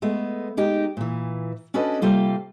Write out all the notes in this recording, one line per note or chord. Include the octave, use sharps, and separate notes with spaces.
G#3 A3 B3
G#3 D#4 G4
A#2 E3
C#4 D4 F#4 A4 B4 D#5
C3 G3 A#3 F4 A4